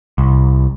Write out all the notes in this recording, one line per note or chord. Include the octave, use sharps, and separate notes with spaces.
C2